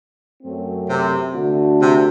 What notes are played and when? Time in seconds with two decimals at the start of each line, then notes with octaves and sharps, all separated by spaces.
0.43 F#2 F#3 A3 C4
0.88 C3
1.35 D3 A3 D4 F#4
1.80 C3